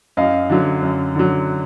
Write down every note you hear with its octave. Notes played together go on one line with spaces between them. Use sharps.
F#2 D#5 F5
D3 F#3
F#2
D3 F#3